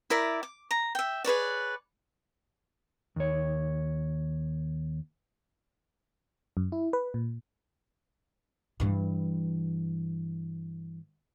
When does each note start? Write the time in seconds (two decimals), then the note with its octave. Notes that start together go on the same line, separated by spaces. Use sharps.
0.10 E4 A#4 D5 E5
0.43 D6
0.71 A#5
0.95 E5 G5
1.24 G#4 B4 C#5 D5
3.16 D#2 C#5
6.57 F#2
6.72 E4
6.93 B4
7.14 A#2
8.80 G2 E3